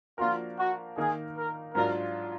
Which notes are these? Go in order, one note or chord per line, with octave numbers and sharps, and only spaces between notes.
F3 A#3 D4 F4 F#4 A#4
F#4
D#3 A#3 D#4 G#4 A#4
A#4
G#2 F#3 D4 F4 A#4